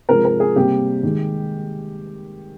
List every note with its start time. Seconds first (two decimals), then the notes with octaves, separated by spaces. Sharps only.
0.09 C3 F3 G#3 A#4
0.25 A#4
0.40 G#4
0.56 C3 G3 A#3 G4
1.03 D#3 G#3